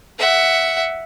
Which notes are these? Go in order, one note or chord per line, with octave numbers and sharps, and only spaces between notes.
E5 F#5